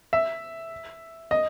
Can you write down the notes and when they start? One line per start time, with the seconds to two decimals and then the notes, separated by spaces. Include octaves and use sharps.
0.13 E5
1.31 D#5